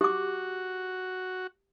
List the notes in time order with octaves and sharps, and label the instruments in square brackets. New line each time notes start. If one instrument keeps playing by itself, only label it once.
[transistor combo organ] F#4 [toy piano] G4 D6